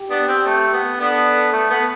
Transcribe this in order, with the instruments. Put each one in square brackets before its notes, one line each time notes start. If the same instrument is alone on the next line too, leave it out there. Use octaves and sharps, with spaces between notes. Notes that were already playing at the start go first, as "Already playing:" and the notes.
Already playing: [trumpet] G4
[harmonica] B3 D4
C4
A3
B3
[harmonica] B3 D4 [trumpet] A4
[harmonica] A3
B3